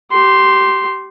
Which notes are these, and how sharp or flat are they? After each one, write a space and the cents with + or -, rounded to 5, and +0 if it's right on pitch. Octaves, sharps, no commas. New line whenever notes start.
G4 -25 C6 +0